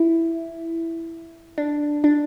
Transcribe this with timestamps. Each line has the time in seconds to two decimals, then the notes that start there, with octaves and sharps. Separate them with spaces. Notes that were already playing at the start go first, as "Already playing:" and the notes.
Already playing: E4
1.58 D4
2.04 D4